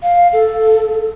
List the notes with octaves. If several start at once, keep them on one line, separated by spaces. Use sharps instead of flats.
F5
A4